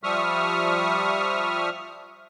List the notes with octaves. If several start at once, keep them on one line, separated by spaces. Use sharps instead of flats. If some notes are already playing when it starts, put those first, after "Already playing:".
F3 G3 E5 C#6 D#6 F6